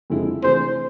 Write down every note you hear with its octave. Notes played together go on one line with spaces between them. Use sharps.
F2 D3 G#3 C4 E4
C3 E3 A3 D4 G#4 C5